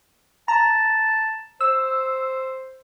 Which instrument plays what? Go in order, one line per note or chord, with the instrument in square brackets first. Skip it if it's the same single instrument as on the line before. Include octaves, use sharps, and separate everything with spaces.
[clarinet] A5 [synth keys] A#5
[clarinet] C5 [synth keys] E6